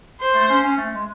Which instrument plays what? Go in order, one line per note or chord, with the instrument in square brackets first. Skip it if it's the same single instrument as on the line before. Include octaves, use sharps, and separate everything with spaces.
[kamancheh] C5
[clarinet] A3
C#4
C#4
A3
G#3